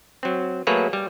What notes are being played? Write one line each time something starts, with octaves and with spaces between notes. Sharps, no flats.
F#3 C4
F#3 A3 A#3 G#4 B4 C#5
G3